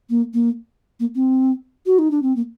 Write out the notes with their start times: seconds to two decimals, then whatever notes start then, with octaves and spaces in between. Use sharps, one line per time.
0.09 A#3
0.33 A#3
0.99 A#3
1.15 C4
1.86 F#4
1.98 D#4
2.10 D4
2.22 C4
2.36 A#3